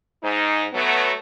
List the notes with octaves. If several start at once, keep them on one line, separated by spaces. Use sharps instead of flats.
G#2 D#4
F#3 A3 B3